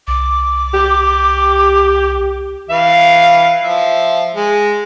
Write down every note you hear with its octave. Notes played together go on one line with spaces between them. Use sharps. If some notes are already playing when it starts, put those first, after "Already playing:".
C2 D6
G4
E3 F5
F3 E5
G#3